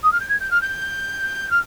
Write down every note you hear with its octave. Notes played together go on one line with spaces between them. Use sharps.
D#6
F6
G6
G#6
G6
F6
G6
F6